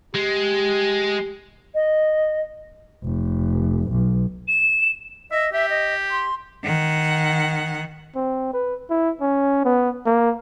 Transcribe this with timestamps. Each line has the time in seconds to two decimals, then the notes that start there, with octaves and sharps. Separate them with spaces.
0.15 G#3 G4
1.75 D#5
3.04 F1
3.92 B1
4.48 E7
5.31 D#5 E5
5.53 G4 E5
5.70 D#5
6.11 C6
6.63 D#3 F#5
8.16 C4
8.53 B4
8.90 E4
9.21 C#4
9.65 B3
10.06 A#3